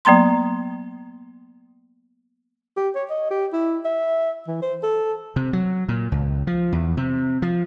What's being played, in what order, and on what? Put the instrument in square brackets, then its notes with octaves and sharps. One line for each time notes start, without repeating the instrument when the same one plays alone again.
[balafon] F#3 A#3 B3 A#5 C6
[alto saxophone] G4
C#5
D#5
G4
E4
E5
E3
C5
A4
[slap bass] C3
F#3
A#2
C#2
F3
E2
C3
F3